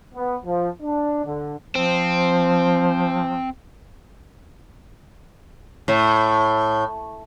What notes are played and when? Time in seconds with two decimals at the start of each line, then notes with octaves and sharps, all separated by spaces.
0.14 B3
0.46 F3
0.82 D4
1.26 D3
1.75 F3 C4
5.88 A2